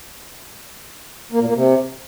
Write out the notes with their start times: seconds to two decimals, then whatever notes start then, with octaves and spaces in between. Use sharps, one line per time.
1.32 A#3
1.40 A#2
1.48 A#3
1.55 C3